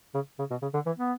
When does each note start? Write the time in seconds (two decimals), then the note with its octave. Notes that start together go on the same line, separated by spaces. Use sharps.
0.14 C#3
0.39 C#3
0.51 B2
0.62 C#3
0.74 D3
0.86 E3
0.98 B3